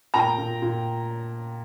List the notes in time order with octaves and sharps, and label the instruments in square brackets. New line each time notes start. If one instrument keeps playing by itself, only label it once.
[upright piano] A#2 G5 A#5
A#2
A#2